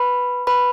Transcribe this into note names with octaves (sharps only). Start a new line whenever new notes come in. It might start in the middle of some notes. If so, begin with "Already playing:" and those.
Already playing: B4 B5
B4 B5